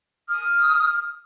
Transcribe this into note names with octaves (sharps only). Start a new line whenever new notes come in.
D#6 F6